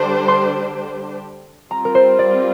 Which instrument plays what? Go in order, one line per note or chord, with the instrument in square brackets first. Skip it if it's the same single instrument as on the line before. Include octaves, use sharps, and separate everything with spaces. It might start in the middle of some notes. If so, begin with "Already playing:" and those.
Already playing: [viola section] D3 G3 D4 G4 C5
[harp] C6
[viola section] G3 C4 F4 [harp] A#5
[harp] A#4
C5
D5